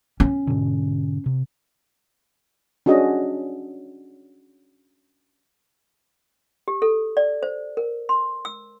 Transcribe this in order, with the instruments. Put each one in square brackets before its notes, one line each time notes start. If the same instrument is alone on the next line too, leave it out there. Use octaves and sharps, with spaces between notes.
[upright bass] C#4
[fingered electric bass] G#2 B2 D3
C3
[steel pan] C#4 D4 F#4 G#4 D#5
[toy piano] G4
A4
D5
C5
A#4
C6
E6